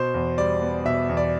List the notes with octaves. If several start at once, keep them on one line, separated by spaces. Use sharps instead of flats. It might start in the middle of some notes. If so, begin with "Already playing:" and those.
Already playing: B2 C5
E2
G3 D5
B3
B2 E5
E2
D5